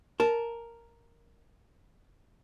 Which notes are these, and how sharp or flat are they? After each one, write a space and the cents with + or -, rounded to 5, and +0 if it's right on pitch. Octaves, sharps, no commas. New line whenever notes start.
A#4 +0 A5 -10